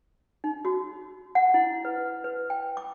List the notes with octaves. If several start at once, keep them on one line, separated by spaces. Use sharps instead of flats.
D#4
F#4
F#5
E4
B4
B4
G5
D6